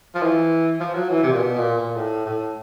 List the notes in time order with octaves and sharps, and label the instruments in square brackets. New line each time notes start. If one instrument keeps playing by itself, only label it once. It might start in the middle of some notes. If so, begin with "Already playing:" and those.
[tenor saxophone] F3
E3
F3
F#3
E3
C3
A#2
B2
A#2
A#2
A2
A2